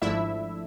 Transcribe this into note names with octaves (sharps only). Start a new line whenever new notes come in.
G#1 G#2 F3 A3 D4 E4 E5